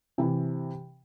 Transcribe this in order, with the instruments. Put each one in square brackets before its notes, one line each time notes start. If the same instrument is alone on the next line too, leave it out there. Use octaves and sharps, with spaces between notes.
[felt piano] C3 E3